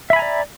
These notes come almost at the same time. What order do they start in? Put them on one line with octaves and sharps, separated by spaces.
E5 B5 G#5 A#5 D5